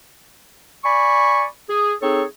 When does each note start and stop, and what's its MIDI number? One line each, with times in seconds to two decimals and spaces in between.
0.84 1.45 74
0.84 1.45 80
0.84 1.45 83
0.84 1.45 85
1.69 1.94 68
2.02 2.23 60
2.02 2.23 63
2.02 2.23 68
2.02 2.23 69
2.02 2.23 73